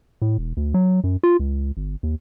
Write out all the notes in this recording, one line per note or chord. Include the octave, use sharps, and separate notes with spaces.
A2
E1
D2
F#3
F#2
F4
C#2
G1
D#2